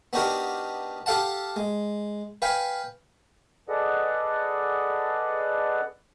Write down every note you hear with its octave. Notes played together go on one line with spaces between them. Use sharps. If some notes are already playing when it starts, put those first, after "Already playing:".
B3 D4 D#4 F#4 G4 A#4
G4 A4 F5 F#5 A5
G#3
B4 F5 G5 G#5
G#4 A4 B4 D5 D#5 F#5